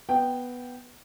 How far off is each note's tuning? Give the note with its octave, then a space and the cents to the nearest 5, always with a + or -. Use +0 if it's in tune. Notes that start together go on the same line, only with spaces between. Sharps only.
B3 +0 G5 -5